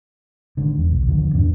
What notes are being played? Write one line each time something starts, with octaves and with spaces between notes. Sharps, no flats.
G#1 G#2 D3
E2
B1
D#2 D3 F3
E2 G#2 D4